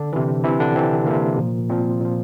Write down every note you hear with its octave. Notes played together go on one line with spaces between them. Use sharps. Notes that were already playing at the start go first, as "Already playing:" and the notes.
Already playing: D3 D4
C3 E3
C3 E3 E4
D3 D4
C3 E3 C4
C3 E3 A#3
A#2 F3
A#2 F3 C4
A#2 F3